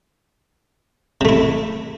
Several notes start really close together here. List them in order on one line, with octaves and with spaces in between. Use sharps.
C3 A3 E4